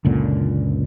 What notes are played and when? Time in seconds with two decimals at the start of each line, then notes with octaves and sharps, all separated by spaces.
0.05 F#1 C#2 A#2 D3